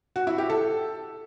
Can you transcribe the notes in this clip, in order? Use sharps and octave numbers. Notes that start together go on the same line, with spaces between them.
F#4
E4
G4
A4